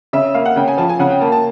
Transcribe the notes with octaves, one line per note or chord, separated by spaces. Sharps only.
C#3 E5
A#3 F5
F#5
C#3 G5
G#5
F3 A5
G#5
C#3 F#5
G5
A#3 A5
A5